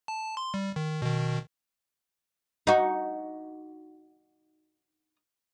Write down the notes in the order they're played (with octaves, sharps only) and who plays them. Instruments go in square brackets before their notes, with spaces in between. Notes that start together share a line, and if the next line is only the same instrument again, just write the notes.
[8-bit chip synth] A5
C6
G3
D#3
B2 D#3
[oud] D#4 F#4